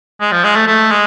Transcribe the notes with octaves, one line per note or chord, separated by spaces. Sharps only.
G#3
F3
G#3
A3
A3
G#3